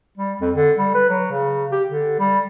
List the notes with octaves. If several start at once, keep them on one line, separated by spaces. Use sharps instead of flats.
G3
F2
D3
G3
B4
F#3
C#3
G4
D3
G3